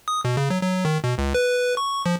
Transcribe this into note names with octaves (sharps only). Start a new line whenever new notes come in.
D#6
B2
C#3
F#3
F#3
D#3
B2
C#2
B4
C#6
F3